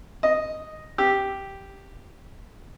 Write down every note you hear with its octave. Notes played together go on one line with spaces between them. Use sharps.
D#5
G4